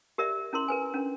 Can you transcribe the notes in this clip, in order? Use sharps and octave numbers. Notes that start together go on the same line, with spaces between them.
G4 A#4 D5 E5
C#4 E4 A#4 C6
A#4 B4 G#5
C#4 D4